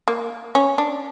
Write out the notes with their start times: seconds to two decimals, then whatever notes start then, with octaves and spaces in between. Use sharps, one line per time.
0.08 A#3
0.55 C#4
0.78 D4